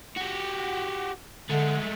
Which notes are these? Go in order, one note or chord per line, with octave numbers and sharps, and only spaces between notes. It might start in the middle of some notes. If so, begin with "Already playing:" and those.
F#4 G4
D3 G#3 A3